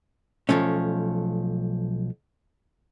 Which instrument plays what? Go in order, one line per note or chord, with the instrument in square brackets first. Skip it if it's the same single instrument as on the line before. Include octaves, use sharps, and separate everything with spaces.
[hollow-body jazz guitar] B1 F2 F3 A3 C#4